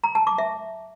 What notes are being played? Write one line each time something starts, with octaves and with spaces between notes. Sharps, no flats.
A#5
A5
D6
E5